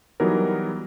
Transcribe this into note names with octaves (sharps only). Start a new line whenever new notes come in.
E3 F#3 G3 B3 D#4 A#4